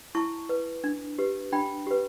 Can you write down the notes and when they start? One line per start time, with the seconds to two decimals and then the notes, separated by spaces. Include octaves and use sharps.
0.15 E4 A5 C#6
0.49 B4
0.84 D4
1.18 G4 B4
1.53 D4 G5 B5
1.87 G4 B4